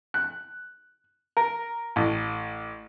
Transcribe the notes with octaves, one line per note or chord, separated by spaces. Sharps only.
F#6
A#4
A1